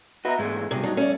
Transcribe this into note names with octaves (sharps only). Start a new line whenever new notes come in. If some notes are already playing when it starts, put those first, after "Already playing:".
F#4 B4 D#5 E5 A#5
E2 G#2 G#3 A3
D2 G2 C3 F#4 G#4
F#3 D4 D#4 F4
A3 C#4 D5